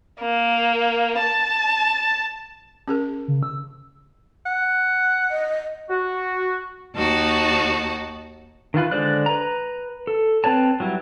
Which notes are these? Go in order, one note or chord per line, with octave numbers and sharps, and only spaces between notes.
A#3
A5
C#4 G#4 A#4
C#3
E6
F#5
D#5
F#4
D#2 D#4 F#4 A5
D#3 E3 F4 B4
D3 G#3 C5 D5 F#6
B4 A#5
A4
C4 B4 C#5 A5
F#3 G3 E4